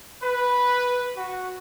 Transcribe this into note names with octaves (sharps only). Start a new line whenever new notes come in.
B4
F#4